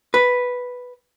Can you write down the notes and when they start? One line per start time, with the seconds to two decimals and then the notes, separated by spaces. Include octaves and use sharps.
0.14 B4